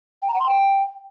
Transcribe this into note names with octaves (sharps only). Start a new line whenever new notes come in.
G5
A#5
F#5
C6
G5